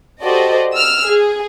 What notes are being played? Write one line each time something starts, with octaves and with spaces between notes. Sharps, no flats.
F#4 G4 A4 C5 D5 D#5
E6 F6
G#4